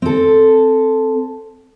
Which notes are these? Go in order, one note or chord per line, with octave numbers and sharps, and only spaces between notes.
C4 A4